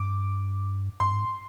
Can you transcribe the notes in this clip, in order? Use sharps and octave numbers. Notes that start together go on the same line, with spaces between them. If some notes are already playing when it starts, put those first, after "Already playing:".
Already playing: G2 D6
G2 C6
G#2